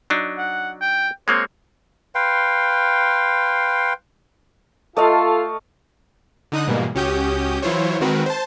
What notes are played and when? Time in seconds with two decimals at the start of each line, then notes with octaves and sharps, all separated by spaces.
0.10 F#3 D4 D#4
0.38 F#5
0.81 G5
1.28 G#3 A#3 C4 C#5
2.15 B4 F5 G5 C6
4.97 A3 F4 A4 D#5 F5
6.52 D3 D#4 D#6 F#6
6.67 G#2 B2 E3 G3 G#3 A#3
6.95 C#2 C#4 F#4 G4 D#6 G6
7.62 E3 F#3 E4 F4 C5 C#5
8.00 D#3 G#3 C4 F#4 A#4 B4
8.26 C5 A5